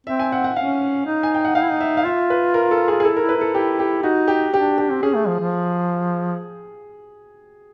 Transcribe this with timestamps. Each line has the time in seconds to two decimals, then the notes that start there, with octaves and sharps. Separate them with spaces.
0.07 C4 E5
0.19 G#5
0.32 F#5
0.44 F#5
0.56 C#4 F5
1.06 D#4
1.23 G#5
1.34 G5
1.45 F#5
1.55 D#4 F5
1.63 E4
1.71 D#4
1.81 E5
1.97 F5
2.05 F4 E5
2.30 B4
2.54 A#4
2.71 A4
2.88 F4 G#4
3.00 G#4
3.04 E4 A4
3.17 E4 A#4
3.29 B4
3.37 E4 A4
3.54 E4 G4
3.79 G4
4.03 D#4 F#4
4.28 G4
4.53 D4 G4
4.78 G4
4.91 C4
5.03 C#4 G#4
5.16 A3
5.27 F3
5.40 F3